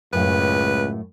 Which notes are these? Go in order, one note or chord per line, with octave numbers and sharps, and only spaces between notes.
C#2 F#2 A2 B4 F5